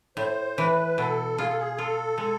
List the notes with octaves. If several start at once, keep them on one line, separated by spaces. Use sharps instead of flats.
A2 C5
E3 B4
B2 A4
F4 G#4
A4
G#4
F4 A4
G#3